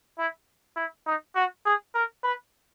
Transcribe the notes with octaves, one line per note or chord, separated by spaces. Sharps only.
E4
E4
D#4
F#4
G#4
A#4
B4